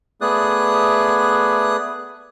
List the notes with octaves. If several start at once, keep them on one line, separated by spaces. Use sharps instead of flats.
A3 B3 G#4 D5 D#6 F#6